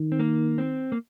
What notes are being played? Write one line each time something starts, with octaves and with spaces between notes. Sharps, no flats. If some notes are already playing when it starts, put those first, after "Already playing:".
Already playing: D#3
C4
A#3
C4
A#3